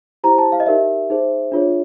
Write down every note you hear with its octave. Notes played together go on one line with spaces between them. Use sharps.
E4 G4 C5 A#5
A5
F5
D#5
D#4 G4 A#4 D5 E5
D#4 G#4 C5
D4 F4 G#4 C#5